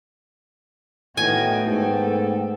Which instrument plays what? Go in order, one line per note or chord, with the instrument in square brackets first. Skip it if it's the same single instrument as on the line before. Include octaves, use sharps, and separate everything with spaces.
[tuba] A2 [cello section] D#3 F#4 [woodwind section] B3 G5 [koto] G#5
[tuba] G#2 [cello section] A3 A4